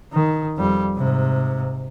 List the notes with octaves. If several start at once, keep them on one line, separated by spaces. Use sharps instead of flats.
D#3
F2 G3
G#2 C3